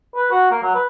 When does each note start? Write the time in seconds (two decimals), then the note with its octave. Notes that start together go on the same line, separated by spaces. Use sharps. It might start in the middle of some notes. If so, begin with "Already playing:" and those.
0.16 B4
0.32 F#4
0.51 A#3
0.63 F#3
0.75 B4